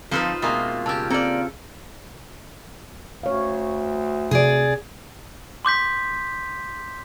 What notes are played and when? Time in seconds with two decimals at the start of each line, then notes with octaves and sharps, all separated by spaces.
0.11 D2 F3 C4 D#4 F4 A4 B4 C5
0.42 B2 G#3 A#3 C4 E5 D#6 A6
0.86 C#3 G4 A5 E6 A6
1.10 A#3 C4 A4 D5 F6
3.23 D2 C#5 F5
4.31 C3 G#4 D5
5.65 C6 D6 G6 B6